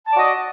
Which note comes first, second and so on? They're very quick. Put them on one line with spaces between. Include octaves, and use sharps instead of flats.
A5 D5 F#4 D#5